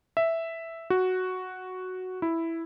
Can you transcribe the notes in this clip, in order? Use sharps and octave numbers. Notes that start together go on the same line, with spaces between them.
E5
F#4
E4